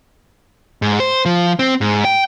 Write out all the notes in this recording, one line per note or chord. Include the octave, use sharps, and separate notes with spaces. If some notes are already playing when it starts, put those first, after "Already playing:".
G#2
C5
F3
C4
G#2
G5